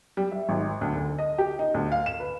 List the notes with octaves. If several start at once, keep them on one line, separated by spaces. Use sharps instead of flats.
G3
E5
G#1
D2
D3
D#5
G4
D#4
D2
F5
E7
B4